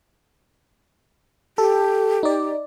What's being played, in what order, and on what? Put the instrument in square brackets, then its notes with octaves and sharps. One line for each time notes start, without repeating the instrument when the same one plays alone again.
[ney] G4 [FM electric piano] A4
[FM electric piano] D#4 D5